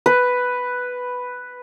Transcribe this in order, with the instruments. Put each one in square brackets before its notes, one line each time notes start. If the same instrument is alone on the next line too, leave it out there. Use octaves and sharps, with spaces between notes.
[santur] B4